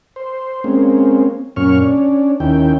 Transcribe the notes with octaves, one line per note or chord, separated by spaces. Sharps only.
C5
G#3 A#3 C4 C#4
F#2 A#2 C#4 C#6 F6
C#4 D4
D#2 D#3 C#4 E4 G5